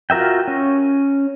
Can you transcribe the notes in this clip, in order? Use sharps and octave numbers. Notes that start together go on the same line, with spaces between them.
F4 F#4 A#4 E5 G5
C#4